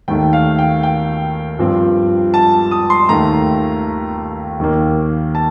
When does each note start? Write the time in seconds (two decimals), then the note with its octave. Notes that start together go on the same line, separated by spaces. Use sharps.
0.08 D#2 D#3 A3 G5
0.33 F5
0.59 G5
0.83 G5
1.59 G2 F3 C4
2.34 A5
2.71 D#6
2.90 C6
3.09 D#2 D#3 A3 A#5
4.60 D#2 D#3 A#3
5.35 A5